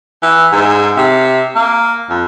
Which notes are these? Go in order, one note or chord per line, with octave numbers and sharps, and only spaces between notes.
E3
G#2
C3
A#3
F2